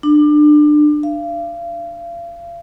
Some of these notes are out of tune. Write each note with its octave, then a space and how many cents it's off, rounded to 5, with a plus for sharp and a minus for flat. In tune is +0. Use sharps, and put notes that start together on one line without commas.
D4 +25
F5 -35